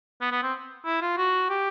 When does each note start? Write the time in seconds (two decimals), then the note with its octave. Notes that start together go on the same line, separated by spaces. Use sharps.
0.21 B3
0.32 B3
0.43 C4
0.85 E4
1.02 F4
1.17 F#4
1.50 G4